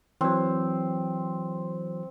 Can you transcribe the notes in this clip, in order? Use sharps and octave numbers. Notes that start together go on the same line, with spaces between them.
E3 F#3 C4